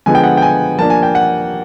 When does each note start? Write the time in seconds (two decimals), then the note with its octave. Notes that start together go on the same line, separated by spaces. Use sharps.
0.06 D3 F3 G#3 B3 G#5
0.15 G5
0.24 F#5
0.37 G5
0.42 G#5
0.79 F3 A#3 D4 A5
0.90 G#5
1.03 G5
1.15 F#5